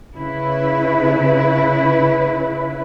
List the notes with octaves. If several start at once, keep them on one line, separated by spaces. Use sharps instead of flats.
C#3 E4 B4